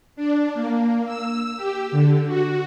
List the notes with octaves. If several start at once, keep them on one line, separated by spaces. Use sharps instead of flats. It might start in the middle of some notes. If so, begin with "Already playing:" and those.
D4
A#3
E6
G4
D3
F#4